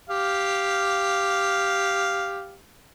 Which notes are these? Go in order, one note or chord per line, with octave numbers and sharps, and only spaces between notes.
G4 F5